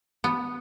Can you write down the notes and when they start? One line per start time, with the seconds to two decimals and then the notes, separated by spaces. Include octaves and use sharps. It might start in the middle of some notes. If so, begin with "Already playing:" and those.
0.24 B3